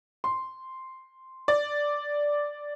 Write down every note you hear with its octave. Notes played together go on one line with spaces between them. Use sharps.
C6
D5